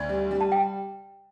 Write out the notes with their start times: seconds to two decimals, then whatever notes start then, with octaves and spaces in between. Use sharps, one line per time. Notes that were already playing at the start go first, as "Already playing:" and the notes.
Already playing: D2 D5
0.09 G3
0.31 G3
0.41 A5
0.52 G5